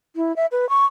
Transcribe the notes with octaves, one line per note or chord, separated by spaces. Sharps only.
E4
E5
B4
C#6